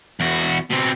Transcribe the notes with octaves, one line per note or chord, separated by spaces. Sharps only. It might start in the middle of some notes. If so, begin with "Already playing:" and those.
E2 F#4
B2 C4